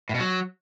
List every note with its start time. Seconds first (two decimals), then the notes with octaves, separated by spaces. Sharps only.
0.09 A2
0.15 B2
0.20 F#3